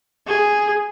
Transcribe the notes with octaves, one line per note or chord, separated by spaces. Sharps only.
G#4